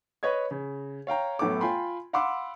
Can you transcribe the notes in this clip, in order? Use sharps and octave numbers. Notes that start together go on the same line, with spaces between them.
B4 C#5 D#5 G#6
C#3
C#5 F5 G5 A#5
F#2 A2 B3 A4 D6
F4 G5 G#5 B5 C6
F5 F#5 B5 C6 D6 E6